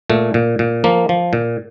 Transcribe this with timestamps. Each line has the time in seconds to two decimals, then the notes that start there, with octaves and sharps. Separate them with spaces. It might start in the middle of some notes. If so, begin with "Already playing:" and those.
0.10 A#2 A3
0.34 A#2
0.59 A#2
0.84 F3 A#3
1.09 F3
1.33 A#2